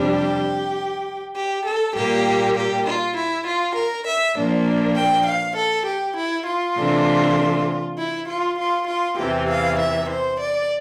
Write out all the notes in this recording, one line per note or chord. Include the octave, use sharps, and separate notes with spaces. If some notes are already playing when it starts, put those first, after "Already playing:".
Already playing: F2 C3 G3 D4
G4
G4
A4
A#2 G3 A#3 G4
G4
F4
E4
F4
A#4
E5
A#2 F3 A#3 D4
G5
F5
A4
G4
E4
F4
C3 E3 A3 D4
E4
F4
F4
F4
E2 C3 E3 G4
F5
E5
C5
D5